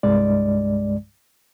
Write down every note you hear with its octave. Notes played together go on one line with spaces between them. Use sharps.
C2 G2 G#3 D5